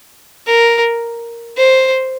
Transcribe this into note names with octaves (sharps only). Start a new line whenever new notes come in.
A#4
C5